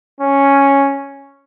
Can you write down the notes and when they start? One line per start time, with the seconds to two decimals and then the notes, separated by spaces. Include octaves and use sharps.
0.21 C#4